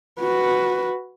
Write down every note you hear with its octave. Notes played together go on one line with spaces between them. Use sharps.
F#4 B4